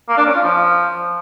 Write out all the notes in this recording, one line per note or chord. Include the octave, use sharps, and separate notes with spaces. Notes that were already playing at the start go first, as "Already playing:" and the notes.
A#3
D4
C#4
F4
F3